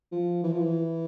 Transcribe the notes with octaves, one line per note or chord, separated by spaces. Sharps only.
F3
E3
F3
E3